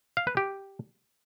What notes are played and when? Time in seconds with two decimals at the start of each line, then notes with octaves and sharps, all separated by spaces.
0.17 F5
0.27 B4
0.37 G4